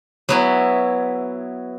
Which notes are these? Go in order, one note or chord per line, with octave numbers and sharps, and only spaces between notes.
F#3 B3 E4